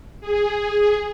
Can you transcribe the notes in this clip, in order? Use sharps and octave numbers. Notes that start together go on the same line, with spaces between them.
G#4